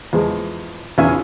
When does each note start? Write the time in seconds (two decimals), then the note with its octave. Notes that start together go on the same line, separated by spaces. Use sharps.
0.13 E2 F3 G#3
0.98 B1 E2 C#4 F4 E5 G#5